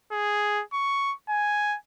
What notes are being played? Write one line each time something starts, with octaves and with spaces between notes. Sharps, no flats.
G#4
C#6
G#5